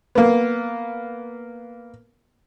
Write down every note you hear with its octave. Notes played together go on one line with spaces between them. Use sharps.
A#3 B3